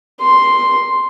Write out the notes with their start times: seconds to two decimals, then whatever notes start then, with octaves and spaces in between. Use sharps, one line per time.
0.22 C6